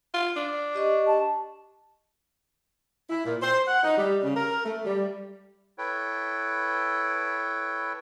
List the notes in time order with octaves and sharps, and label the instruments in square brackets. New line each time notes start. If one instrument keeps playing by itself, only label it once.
[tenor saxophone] F4
D4
[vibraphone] G4 D#5 C#6
[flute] A5
[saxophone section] E4
A#2
C5
F#5
D#4
G3
C#3
A#4
A3
G3
[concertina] E4 A4 B4 C#5 G5